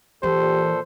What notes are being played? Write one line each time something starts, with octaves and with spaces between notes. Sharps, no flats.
A#2 E3 G4 A4 C5